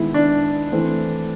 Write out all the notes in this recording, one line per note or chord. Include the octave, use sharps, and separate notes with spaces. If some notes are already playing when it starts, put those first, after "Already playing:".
Already playing: D#3 G#3 B3 E4
D4
E3 A3 C4